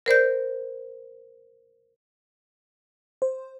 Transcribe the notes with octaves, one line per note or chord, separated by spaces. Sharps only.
A#4 C5 D5 G6
C5